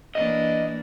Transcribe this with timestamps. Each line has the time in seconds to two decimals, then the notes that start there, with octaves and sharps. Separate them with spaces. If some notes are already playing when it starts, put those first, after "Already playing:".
0.15 E3 A#3 D4 D#5